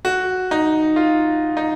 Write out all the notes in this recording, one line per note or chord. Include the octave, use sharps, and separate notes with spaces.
F#4
D#4
F4
D#4